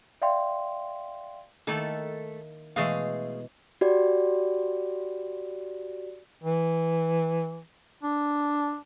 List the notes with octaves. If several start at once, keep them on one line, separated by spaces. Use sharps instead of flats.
D5 E5 F5 G5 C6
D#3 A3 A#3 E4 A4
B2 E3 G#3 A3 G#4 F5
F#4 G4 D5
E3
D4